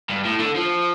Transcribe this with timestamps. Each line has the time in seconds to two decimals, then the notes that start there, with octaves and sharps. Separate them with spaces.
0.09 G2
0.25 A2
0.40 D3
0.56 F3